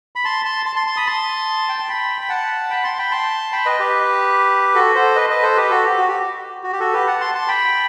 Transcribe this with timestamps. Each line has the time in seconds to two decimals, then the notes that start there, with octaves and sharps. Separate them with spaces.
0.16 B5
0.25 A5 C6
0.45 A5 C6
0.66 A5 C6
0.76 A5 C6
0.87 A5 C6
0.97 B5 D#6
1.07 A5 C6
1.69 G5
1.79 A5
1.89 G5 B5
2.21 B5
2.29 F#5 A5
2.70 G5 B5
2.84 A5 C6
2.98 G5 B5
3.11 A5 C6
3.52 G5 B5
3.66 B4 D#5
3.80 G4 B4
4.75 F#4 A4
4.95 A4 C5
5.16 B4 D#5
5.30 B4 D#5
5.43 A4 C5
5.57 G4 B4
5.70 F#4 A4
5.85 G4
5.98 F#4
6.08 G4
6.64 F#4
6.72 G4
6.80 F#4 A4
6.93 G4 B4
7.07 F#5 A5
7.20 A5 C6
7.35 A5 C6
7.48 G5 B5